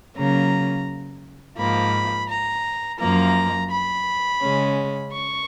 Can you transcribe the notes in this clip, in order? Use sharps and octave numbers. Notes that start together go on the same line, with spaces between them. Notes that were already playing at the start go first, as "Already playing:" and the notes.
C#3 F#3 A#3 C#4 A#5
G#2 F3 A#3 B5
A#5
F#2 F3 A#3 A#5
B5
C#3 G#3 C#4
C#6